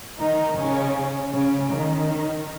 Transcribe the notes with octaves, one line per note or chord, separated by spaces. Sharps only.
D#3 D#4
C#3 C#4
C#3 C#4
D#3 D#4